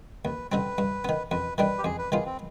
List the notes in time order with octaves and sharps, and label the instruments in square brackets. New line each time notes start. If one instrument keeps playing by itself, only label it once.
[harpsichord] D#2 [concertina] B4
[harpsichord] D3 G3 C4 [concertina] B4
[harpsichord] G2
D#3 B3
[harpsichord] F2 [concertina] B4
[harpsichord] D#3 G3 D4 [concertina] B4
[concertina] G4
[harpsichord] F2 [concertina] G#4
[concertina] B4
[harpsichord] D#3 B3 F4 [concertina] G#4
[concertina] C4